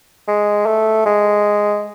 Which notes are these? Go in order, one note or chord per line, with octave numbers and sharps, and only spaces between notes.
G#3
A3
G#3